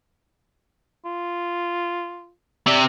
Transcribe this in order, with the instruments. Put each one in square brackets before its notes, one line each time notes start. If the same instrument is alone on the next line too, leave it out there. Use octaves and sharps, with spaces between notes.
[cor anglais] F4
[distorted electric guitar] C3 [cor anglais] D5